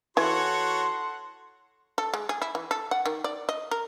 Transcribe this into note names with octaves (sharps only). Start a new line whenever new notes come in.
E3 F#4 A4 C#5 F#5 C6
A4
G#3
G#4
E4
E3
A4
F#5
D#3
D5
D#5
A#4